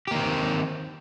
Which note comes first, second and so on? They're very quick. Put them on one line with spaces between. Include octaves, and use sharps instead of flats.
G4 A#3 D#3 C4